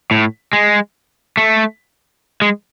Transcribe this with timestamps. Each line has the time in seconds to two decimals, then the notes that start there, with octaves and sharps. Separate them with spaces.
0.11 A2
0.53 G#3
1.37 A3
2.42 G#3